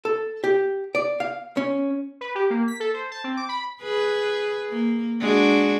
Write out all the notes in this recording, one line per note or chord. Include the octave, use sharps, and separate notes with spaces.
A4
G4
D5
F5
C#4
B4
G4
A#3
B6
A4
C5
A5
C4
D6
B5
G#4 B4
A#3
G#3 D4 F#4